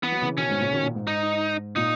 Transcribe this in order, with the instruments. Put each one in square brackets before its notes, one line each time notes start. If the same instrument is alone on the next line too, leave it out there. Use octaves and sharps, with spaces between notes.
[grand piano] E3 [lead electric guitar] B3
[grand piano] F#3
C#3 E3
[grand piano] B2 D#3 [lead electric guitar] C#4
[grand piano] G#2 B2
A#2 C#3
B2 D#3
A#2
G#2
[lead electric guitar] D#4
[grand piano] A#2 [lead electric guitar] D#4